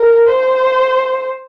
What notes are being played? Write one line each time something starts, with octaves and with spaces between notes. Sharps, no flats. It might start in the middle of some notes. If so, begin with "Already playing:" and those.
Already playing: A#4
C5